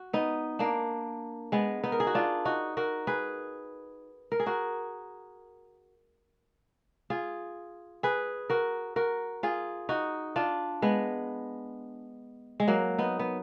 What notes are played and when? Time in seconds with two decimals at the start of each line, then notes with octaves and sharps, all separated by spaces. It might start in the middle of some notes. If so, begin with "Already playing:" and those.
Already playing: F#4
0.13 B3 D#4
0.59 A#3 D4
1.52 G#3 B3
1.84 B3 D#4
1.92 A#4
2.00 G#4
2.07 F#4
2.15 D4 F4
2.45 D#4 F#4
2.77 F#4 A#4
3.07 G#4 B4
4.32 A#4
4.40 G#4
4.46 F#4 A#4
7.10 F4 G#4
8.03 G#4 B4
8.50 F#4 A#4
8.96 F#4 A#4
9.43 F4 G#4
9.89 D#4 F#4
10.36 D4 F4
10.82 G#3 B3
12.60 G#3
12.68 F#3 A#3
12.98 B3 D#4
13.19 B3